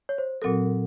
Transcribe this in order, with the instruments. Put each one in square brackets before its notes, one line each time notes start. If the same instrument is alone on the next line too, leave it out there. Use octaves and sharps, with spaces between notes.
[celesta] C#5
C5
[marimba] A#2 F#3 C4 F#4 A#4 [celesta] A4